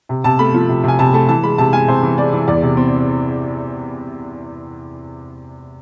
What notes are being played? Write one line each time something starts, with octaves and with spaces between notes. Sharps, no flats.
C3
C3 A5
A3 B5
F3
C3
C3 G#5
C3 A5
A3 A5
E3 A5
G#3 B5
C3 A5
G#3 G#5
C3 C5
E3
G#3 D5
E3
E2 D5
C3
C4